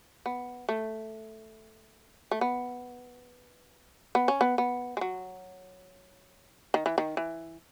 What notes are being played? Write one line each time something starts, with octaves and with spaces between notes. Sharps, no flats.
B3
A3
A3
B3
B3
C#4
B3
B3
G#3
F#3
D#3
E3
D#3
E3